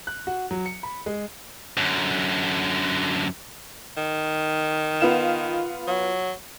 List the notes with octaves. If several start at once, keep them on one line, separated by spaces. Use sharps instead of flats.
F#6
F#4
F#3
C#7
B5
G#3
F#2 D3
D#3
B3 F4 E7
F#3